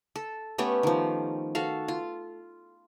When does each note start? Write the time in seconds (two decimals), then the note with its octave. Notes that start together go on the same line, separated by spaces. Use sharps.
0.16 A4
0.58 A3 B3 C#4 G4
0.83 D#3 F3
1.55 F#4 A4 F5
1.88 F4